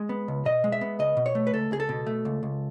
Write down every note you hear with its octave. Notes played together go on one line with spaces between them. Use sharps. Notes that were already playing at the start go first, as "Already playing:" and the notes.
Already playing: G#3
B3
C#2
B2 D#5
G#3
E5
B3
C#2 D#5
B2
C#5
A3
B4
C#2 A4
C#2 G#4
A4
B2
A3
C#2
C#2